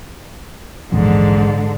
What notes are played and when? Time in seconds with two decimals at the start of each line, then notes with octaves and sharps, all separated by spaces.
0.92 A#1 E2 G#2 D3